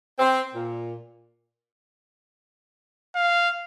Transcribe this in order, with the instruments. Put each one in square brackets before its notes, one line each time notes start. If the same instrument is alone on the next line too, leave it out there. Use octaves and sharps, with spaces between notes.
[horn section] C4
A#2
[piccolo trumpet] F5